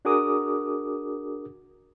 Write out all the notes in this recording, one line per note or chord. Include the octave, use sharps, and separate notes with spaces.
D4 F#4 G#4 A#4 D6 D#6